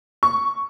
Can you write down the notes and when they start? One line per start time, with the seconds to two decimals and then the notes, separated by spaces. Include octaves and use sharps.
0.23 C#6